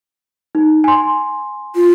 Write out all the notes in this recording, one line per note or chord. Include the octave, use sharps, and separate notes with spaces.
D#4
G#5 C6
F4